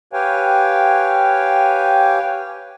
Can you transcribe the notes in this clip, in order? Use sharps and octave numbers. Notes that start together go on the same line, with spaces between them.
G4 B4 C#5 F5 G5 G#5